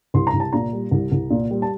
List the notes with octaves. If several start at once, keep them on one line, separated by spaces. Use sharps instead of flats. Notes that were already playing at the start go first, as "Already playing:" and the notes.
C2 C6
A#5
C2
A5
A#2 A#5
G3
C2
C2
A#2
G3
A5